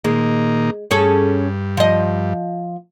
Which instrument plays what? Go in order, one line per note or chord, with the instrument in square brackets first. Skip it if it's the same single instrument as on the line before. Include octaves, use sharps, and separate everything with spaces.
[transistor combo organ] A#2 D#3 A#3 [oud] G#3
[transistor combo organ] G2 [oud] C#4 G#4 A4
[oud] F3 D#5